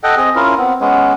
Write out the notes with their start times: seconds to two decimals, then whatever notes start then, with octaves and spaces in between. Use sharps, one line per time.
0.04 A4 D#5 F#5 G5
0.17 C4 G#4 D#5
0.36 C#4 E4 F4 A#4
0.58 B3 C4
0.81 G#3 B3 C#4